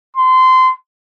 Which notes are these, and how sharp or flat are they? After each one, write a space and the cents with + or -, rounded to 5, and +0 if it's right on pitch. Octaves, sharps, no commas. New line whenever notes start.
C6 -25